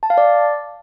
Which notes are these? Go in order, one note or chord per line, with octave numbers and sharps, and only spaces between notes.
A5
F5
D5